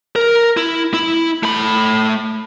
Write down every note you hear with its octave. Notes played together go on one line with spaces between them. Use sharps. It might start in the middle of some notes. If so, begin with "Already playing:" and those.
A#4
E4
E4
A3 B5